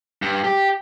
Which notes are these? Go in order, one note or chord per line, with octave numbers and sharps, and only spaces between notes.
G2
G4